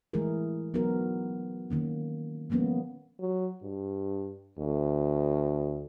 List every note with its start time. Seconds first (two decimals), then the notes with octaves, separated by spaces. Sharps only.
0.13 E3 G#3 A3 E4 G#4 A#4
0.74 F#3 B3 D#4 F#4 A#4
1.70 D#3 A#3 C#4
2.50 F3 G3 A#3 B3 C#4
3.19 F#3
3.63 G2
4.58 D2